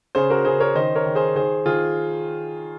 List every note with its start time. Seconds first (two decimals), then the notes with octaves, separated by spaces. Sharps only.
0.15 C#3 G#4 C5
0.30 F#4 A#4
0.45 C#3 G#4 C5
0.60 A#4 C#5
0.75 D#3 C5 D#5
0.96 A#4 C#5
1.06 D#3
1.15 G#4 C5
1.36 D#3 G#4 C5
1.66 D#3 F4 G#4